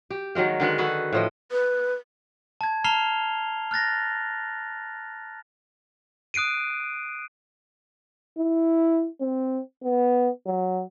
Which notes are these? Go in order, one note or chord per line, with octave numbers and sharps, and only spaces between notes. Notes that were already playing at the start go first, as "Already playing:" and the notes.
G4
D#3 F#3 G#3 A#3
D3 D#3 G#3 B4
F#4 G#4 A4 B4
A2 F3 D#5
B4
A5 G#6
A5 A#5 F6 C7 F7 G7
F6 F#6 A6 A#6
D#6 F#6 C7 D7 D#7
E4
C4
B3
F#3